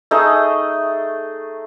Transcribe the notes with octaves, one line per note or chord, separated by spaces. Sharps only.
A3 D#4 G#4 D#5